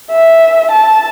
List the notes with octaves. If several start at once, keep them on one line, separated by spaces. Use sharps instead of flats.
E5
A5